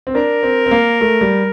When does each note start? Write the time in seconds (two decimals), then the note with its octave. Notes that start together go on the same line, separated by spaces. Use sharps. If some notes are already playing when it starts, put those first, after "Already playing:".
0.07 C4
0.15 D4 A#4
0.43 C4
0.66 C4
0.71 A#3
1.01 A3
1.21 G3